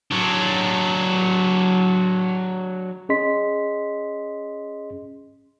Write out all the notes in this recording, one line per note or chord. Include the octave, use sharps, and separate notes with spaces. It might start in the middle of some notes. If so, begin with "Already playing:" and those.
F#3 D4
C#4 G#4 D#5 C6 B6